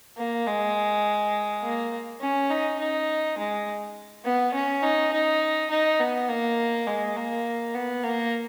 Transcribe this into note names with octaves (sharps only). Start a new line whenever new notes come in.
A#3
G#3
A#3
C#4
D#4
D#4
G#3
B3
C#4
D#4
D#4
D#4
B3
A#3
G#3
A#3
B3
A#3